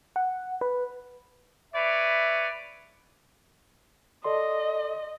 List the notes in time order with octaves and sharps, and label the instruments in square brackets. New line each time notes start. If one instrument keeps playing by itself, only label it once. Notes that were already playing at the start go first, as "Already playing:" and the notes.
[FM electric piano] F#5
B4
[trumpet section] B4 C#5 D5 [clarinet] E5
[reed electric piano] A4 D5 C6 [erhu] D#5